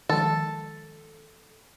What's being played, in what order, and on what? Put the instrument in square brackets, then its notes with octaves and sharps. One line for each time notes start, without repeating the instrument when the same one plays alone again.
[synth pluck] D#3 F3 G#3 [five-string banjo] A4